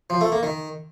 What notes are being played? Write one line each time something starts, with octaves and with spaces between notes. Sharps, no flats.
F3
A3
A#3
D#3